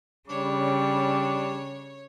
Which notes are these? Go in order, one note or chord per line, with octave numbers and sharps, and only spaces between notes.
C#3 G3 D4 C#5